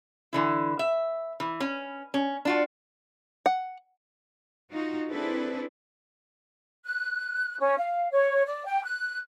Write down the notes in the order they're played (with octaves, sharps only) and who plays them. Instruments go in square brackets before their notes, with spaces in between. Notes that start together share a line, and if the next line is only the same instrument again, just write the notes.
[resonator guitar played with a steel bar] D3 E3 E4
E5
E3
C#4
C#4
D4 F4 F#4
[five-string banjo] F#5
[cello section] D#4 F4 F#4
C4 D4 E4 G#4 A4 B4
[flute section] F#6
C#4
F5
C#5
D5
G5
F#6